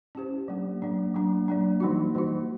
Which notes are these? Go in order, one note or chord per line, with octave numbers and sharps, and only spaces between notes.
C#4 E4 G4 C5
F#3 A#3 D4
F#3 A#3 D4
F#3 A#3 D4
F#3 A#3 D4
E3 G3 A#3 D#4 F#4
E3 G3 A#3 D#4 F#4